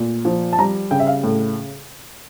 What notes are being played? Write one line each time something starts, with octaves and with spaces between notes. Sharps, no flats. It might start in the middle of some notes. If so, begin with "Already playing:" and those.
Already playing: A#2 A3
F3
A5
G3 A#5
C#3 G5
E5
F5
A2